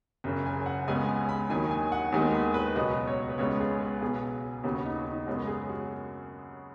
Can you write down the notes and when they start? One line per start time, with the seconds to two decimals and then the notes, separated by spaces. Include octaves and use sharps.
0.24 F#1 F#2 C#3
0.46 G#5
0.66 F#5
0.87 C#2 C#3 G#3 B3 G#5
1.08 G#5
1.29 B5
1.50 D#2 D#3 F#3 G#5
1.71 G#5
1.92 F#5
2.12 D#2 D#3 G#3 B3 G#5
2.34 B5
2.54 B4
2.75 C#2 B2 F#3 B3 D#5
3.07 C#5
3.29 B4
3.38 C#2 C#3 G#3 B3 C#5
3.60 G#4
3.81 B4
4.01 B1 B2 B3 G#4
4.63 D#2 C#3 B3 F#4
4.85 D#4
5.06 D#4
5.26 F#2 C#3 G#3 B3 F#4
5.47 G#4
5.69 F#4